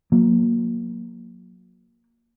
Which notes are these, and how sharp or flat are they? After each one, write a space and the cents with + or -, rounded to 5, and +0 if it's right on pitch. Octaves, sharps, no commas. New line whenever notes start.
F#3 -30 A#3 +0